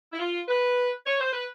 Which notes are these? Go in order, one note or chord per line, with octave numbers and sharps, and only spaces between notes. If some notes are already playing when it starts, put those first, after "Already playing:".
E4
F4
B4
C#5
C5
B4